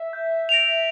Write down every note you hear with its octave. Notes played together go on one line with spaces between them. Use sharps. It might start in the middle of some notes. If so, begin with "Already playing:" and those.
Already playing: E5
G6
A#6 D7 F7